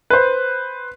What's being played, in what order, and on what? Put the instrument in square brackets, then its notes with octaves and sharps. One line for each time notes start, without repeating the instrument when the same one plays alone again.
[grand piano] B4 C5